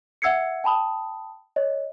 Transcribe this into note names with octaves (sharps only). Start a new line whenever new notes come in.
E5 F#5 E6 G#6 C7 C#7
G5 A5 B5 D#6
C#5 D#5